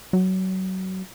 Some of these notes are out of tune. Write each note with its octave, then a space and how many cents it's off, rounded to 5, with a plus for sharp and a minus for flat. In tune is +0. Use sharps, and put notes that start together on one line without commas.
F#3 +25